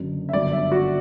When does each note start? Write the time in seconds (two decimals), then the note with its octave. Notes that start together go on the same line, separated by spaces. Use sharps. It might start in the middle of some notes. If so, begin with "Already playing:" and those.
Already playing: F#1 F#2 D3
0.29 E5
0.33 G1 F#2 D3 D5
0.52 E5
0.72 F#4